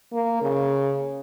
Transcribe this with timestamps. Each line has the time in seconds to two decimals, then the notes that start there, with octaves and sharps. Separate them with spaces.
0.12 A#3
0.41 C#3